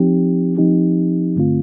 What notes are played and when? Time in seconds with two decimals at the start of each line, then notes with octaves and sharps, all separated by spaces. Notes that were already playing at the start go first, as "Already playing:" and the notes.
Already playing: F3 C4 D#4 G4
0.57 F3 C4 D#4 G4
1.36 G2 D3 A3 C4 F4